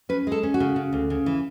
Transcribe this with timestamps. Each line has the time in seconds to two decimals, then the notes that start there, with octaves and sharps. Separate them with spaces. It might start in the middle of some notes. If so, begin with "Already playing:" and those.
0.09 C#4 B4
0.27 G#3 A4
0.43 C#4
0.54 F#4
0.60 C#3
0.76 C#3
0.93 D2
1.10 C#3
1.26 E3